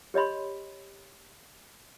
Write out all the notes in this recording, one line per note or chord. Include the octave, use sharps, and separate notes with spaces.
G4 C#5 D#5 B5 C6